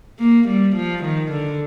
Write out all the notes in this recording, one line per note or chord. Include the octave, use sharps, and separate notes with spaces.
A#3
G3
F3
D#3
D3